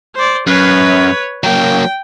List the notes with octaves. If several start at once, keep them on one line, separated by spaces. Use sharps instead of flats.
C5 D5
F#2 B4 C#5
F#3 A#3 G5